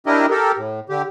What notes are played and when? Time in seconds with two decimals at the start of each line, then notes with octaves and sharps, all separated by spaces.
0.06 D4 E4 G4 A#4 D#5
0.30 G4 A4 A#4
0.57 A2
0.89 D3 G4